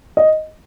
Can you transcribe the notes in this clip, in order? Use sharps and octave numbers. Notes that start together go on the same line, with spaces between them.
D#5